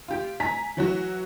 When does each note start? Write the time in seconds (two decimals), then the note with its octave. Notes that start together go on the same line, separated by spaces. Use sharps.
0.08 F4 G4
0.40 G#5 A#5 B6
0.77 E3 F#3 F#4